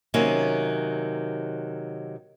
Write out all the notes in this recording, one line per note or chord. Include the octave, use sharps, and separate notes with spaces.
C3 D#3 F#3 A#3 C#4